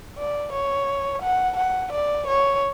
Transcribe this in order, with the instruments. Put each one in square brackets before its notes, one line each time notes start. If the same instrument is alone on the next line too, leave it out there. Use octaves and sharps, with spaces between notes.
[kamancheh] D5
C#5
F#5
F#5
D5
C#5